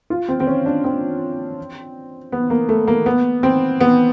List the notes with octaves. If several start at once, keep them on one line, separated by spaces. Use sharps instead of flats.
F4
C4
C4
C#4
D4
C4
B3
A#3
A3
A#3
B3
C4
B3